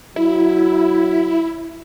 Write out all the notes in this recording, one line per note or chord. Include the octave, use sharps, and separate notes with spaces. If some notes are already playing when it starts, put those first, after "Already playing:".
F#3 E4